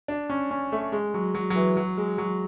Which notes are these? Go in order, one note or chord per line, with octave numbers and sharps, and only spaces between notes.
D4
C#4
C#4
A3
G#3
F#3
F#3
F#3
E3
F#3
G#3
F#3